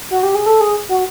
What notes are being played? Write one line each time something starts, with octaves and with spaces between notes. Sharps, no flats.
F#4
G4
G#4
A4
G#4
F#4